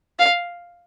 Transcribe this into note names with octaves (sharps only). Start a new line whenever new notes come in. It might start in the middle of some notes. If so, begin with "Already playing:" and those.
F5